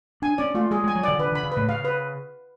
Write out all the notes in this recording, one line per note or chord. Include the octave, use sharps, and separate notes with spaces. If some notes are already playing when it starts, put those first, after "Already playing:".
D4 G#5
C#4 D5
A3 F4
G#3 G#4
G#3 G#5
F#3
D3 D5
D3 B4
D3 B5
C#3
A2 B4
C#3 F5
B4